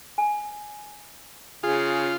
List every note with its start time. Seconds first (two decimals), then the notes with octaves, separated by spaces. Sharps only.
0.18 G#5
1.63 C#3 F4 G#4